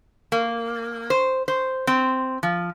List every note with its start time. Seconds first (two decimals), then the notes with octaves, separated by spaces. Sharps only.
0.32 A#3
1.10 C5
1.48 C5
1.87 C4
2.43 F3